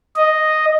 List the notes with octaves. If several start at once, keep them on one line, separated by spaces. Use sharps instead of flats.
D#5